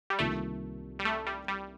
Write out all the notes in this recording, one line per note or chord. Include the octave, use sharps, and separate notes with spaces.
G3
C2 C3 D#3 A3 A#3 F4
G3
A3
G3
G3